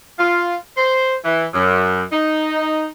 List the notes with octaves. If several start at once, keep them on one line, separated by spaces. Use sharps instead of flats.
F4
C5
E3
F#2
D#4